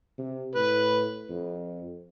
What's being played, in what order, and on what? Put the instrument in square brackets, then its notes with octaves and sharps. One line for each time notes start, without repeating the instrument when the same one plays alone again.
[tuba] C3
[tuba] A2 [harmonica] B4
[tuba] F2